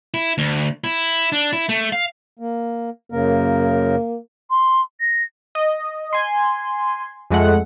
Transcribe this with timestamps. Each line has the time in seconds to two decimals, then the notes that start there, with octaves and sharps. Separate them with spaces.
0.14 E4
0.38 D2
0.84 E4
1.32 D4
1.53 E4
1.69 A3
1.92 F5
2.39 A#3
3.12 F#2 C#3 A#3 A#4
4.50 C6
5.00 A#6
5.55 D#5
6.13 G#5 C6
7.30 F2 G#3 A3 F#5